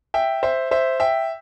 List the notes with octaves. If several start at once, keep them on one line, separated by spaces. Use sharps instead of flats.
E5 G5
C5 E5
C5 E5
E5 G5